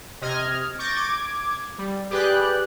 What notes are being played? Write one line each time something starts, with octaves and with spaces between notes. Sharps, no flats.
C3 D#5 F6 G#6
C#6 D6 G6 A6 A#6
D6 G#6
G3
G4 G#4 B4 D5 G5 F#6